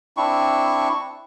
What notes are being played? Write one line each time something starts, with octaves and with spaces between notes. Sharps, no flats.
C4 D4 E4 C#6